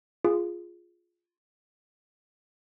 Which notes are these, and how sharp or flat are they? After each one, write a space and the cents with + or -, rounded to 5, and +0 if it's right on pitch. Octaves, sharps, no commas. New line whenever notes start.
F4 +0 G#4 +0